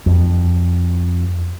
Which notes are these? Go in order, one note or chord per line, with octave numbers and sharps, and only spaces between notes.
F2